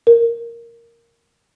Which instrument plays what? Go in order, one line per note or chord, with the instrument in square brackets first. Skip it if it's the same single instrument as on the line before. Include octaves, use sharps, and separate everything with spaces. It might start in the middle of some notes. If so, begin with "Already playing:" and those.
[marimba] A#4